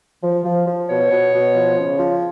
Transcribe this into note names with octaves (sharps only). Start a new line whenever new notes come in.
F3
F3
F3
B2 C#5
B2
B2
F3
C#3
F3